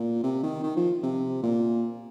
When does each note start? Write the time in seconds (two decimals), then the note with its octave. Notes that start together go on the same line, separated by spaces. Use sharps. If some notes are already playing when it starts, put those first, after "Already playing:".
Already playing: A#2
0.23 C3
0.43 D#3
0.63 D#3
0.77 F3
1.03 C3
1.43 A#2